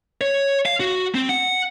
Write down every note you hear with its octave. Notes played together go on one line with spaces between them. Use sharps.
C#5
F5
F#4
C4
F#5